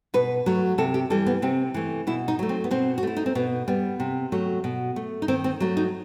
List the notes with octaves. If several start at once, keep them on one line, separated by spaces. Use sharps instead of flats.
B2 B4
F#3 A3
C3 A4
G4
E3 G3 A4
B3
C3 C4
E3 A3
B2 E4
D#4
F#3 A3
C4
B3
B2 C4
F#4
A3 E4
D#4
C4
B2 B3
G3 B3
C3
F#3 A3
B2
A3
D#4
D#3 C4
C4
F#3 A3
D#4